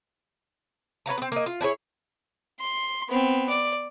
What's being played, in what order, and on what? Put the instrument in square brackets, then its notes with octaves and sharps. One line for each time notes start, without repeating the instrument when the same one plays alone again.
[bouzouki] B4 C#5 F5 A#5
B3 C4
A#3 D#5
F4
D4 E4 G#4 C#5
[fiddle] C6
B3 C4
D5